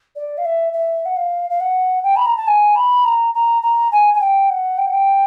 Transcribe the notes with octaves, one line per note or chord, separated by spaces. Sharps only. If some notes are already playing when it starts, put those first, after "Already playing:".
D5
F5
E5
E5
F#5
F5
F5
F#5
G5
B5
A#5
A5
G#5
B5
A#5
A#5
A#5
G#5
G#5
G5
F#5
G5
F#5
G5